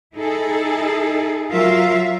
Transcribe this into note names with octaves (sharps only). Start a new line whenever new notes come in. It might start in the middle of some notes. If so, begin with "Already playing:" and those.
D#4 E4 G#4 A4
F#3 F4 A#4 E5 F5